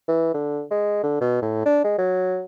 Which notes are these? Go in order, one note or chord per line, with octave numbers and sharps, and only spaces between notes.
E3
D3
G#3
D3
B2
A2
D4
G#3
F#3